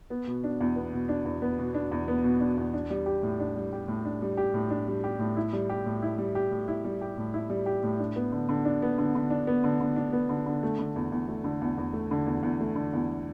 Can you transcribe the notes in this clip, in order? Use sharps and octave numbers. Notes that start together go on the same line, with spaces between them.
B3
B2
D4
E2
B3
B2
D4
E2
B3
B2
D4
E2
B3
B2
D4
E2
D4
G3
G4
A2
D4
G3
G4
A2
D4
G3
G4
A2
D4
G3
G4
A2
E4
G3
G4
A2
E4
G3
G4
A2
E4
G3
G4
A2
E4
G3
G4
A2
D4
B3
D3
D3
D4
B3
D3
D3
D4
B3
D3
D3
D4
B3
D3
D3
A3
D3
E2
E2
A3
D3
E2
E2
A3
D3
E2
E2
A3
D3
E2